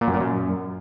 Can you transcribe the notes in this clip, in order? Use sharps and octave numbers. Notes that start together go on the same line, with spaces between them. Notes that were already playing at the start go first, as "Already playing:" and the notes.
A#2
F#2
A#2
F#2